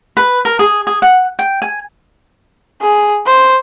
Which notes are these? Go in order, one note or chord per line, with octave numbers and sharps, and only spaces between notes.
B4
A#4
G#4
G#4
F#5
G5
G#5
G#4
C5